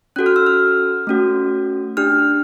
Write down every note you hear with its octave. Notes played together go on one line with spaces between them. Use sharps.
C#4 F#4 A4 F#6
F6
E6
F6
A3 C#4 F#4
D4 G4 F6